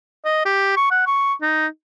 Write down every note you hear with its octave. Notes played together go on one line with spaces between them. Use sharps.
D#5
G4
C#6
F#5
C#6
D#4